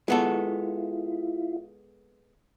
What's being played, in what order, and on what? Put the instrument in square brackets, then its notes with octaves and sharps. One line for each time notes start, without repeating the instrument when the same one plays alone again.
[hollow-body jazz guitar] G#3 B3 A4 [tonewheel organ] E4 F4